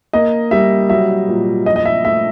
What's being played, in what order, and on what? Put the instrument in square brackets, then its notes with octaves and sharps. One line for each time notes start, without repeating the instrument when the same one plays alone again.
[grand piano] A#3 [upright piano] D#5
[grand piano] G3 [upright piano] E5
[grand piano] F#3 [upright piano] E5
[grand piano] A#2
[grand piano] F3 [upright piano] D#5
[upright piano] D#5
E5
[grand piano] A3 [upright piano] E5